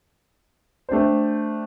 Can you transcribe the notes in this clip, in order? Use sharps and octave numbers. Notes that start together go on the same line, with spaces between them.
A3 D4 G4 C5